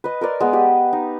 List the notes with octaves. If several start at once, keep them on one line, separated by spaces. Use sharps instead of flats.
B4 D#5
A#4 B4 D5 C6
G#3 B3
G4 D#5
D#4